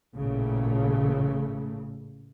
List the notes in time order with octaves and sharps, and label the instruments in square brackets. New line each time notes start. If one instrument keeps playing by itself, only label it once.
[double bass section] A1 A#2 C#3 A3